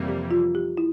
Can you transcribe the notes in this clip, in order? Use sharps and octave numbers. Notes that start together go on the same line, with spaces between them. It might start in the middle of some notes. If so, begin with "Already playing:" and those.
Already playing: F2 C3 E3 G3 A#3
G4
F4
G4
E4